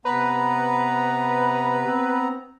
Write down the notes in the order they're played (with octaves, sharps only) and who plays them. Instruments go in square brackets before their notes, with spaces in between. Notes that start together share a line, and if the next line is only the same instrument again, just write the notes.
[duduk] C3 [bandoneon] B3 A#5 [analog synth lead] B4
[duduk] C4